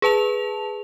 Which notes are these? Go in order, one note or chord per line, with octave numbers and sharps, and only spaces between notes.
G#4 B4 A5 F7